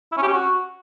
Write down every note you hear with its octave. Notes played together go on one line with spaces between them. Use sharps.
E4
C#4
G4
C#4
F#4